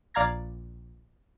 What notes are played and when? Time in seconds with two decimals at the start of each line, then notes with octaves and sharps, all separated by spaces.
0.14 A#1 D5 F5 A#5 G#6 A#6